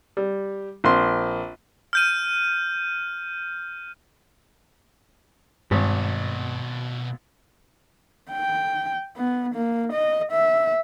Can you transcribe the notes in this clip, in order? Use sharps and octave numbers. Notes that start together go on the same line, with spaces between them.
G3
A#1 C4 C6
F6 G6 D#7
G#1 G2 B2 D5
G5
B3
A#3
D#5
E5